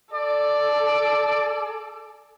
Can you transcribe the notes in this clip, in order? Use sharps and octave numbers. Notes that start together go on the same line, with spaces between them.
A4 D5